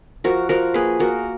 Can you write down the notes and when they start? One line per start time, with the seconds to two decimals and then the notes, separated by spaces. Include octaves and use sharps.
0.24 F3 F#4 A#4
0.49 F3 F#4 A#4
0.74 A#3 G#4 B4
0.99 A#3 F#4 A#4